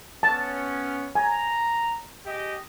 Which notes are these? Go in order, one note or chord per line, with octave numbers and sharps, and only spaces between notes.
B3 C#4 A5
G#5 A#5
G4 G#4 D#5